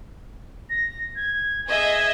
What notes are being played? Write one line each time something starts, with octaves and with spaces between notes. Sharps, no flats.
A#6
G#6
G#4 D#5 E5 G#6